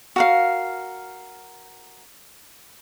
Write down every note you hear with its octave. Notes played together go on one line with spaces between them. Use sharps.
F#4 A#4 F5